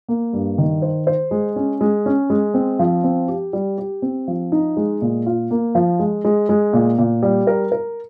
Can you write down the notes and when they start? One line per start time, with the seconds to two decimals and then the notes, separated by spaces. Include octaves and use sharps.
0.08 A#3
0.33 G2
0.58 D#3
0.82 C5
1.07 C5
1.31 G#3
1.56 C#4
1.81 G#3
2.06 C#4
2.30 G#3
2.54 C4
2.79 F3
3.04 C4
3.28 G4
3.53 G3
3.78 G4
4.02 C4
4.28 F3
4.52 D#4
4.77 G#3
5.01 A#2
5.26 F4
5.51 A#3
5.75 F3
5.99 G#3
6.25 G#3
6.49 G#3
6.73 A#2
6.98 A#2
7.23 G3
7.47 A#4
7.72 A#4